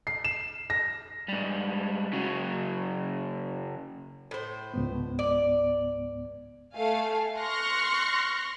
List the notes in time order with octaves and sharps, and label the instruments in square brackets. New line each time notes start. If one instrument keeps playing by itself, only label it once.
[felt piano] C7
E7
A#6
[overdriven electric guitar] G#2 G3
C#3 F#3
[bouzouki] A2 C5
[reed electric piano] C#2 G#2 B3
[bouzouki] D5
[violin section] A3 F5 G#5
C6 C#6 F6 F#6 A#6 C#7